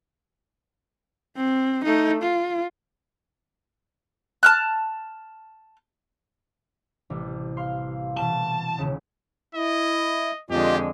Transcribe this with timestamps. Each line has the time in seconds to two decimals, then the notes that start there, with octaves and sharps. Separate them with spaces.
1.36 C4
1.85 A3 D#4
2.22 F4
4.43 A5 F6 F#6
7.10 A1 C3 G3
7.57 F5 C6
8.17 B2 E3 A5
8.78 D#1 C#3
9.55 E4 D#5
10.51 F2 D3 G#3 F4 G4 D#5